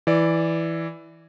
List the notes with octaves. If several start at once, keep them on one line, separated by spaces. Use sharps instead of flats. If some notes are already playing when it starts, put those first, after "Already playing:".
E3 D5